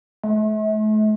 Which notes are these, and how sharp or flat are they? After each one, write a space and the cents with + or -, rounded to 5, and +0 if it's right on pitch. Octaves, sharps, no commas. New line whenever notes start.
A3 -40